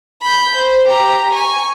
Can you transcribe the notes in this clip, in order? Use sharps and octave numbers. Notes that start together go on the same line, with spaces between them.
B5 G6
C5
G4 A#5
G#5 C#6